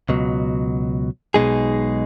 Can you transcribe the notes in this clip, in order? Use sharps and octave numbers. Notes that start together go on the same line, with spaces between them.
C#2 B2 F#3
B1 B2 G#3 D#4 G#4